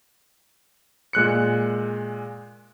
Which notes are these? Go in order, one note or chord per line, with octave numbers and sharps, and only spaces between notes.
A#2 G#3 F#6 C#7